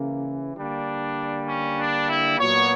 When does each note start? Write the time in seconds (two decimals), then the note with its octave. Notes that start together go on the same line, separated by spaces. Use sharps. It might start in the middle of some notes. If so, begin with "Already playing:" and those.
Already playing: C#3 E3 A#3
0.57 D3 G3 A#3 D4
1.47 C#4
1.79 D4
2.09 E4
2.39 A#2 F#3 B3 C#5